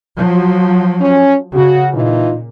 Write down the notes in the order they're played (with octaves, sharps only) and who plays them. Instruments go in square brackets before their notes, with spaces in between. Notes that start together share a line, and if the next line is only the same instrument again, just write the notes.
[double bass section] F3 F#3
[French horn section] C#4
[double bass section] C#3 [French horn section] F#4
[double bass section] A#2 [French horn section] E3 D#4 F4